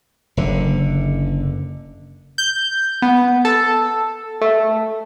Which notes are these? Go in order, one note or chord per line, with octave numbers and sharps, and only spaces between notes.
F#1 D3
G6
B3
A4
A3